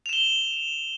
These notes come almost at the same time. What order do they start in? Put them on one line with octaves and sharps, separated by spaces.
F7 E7 G7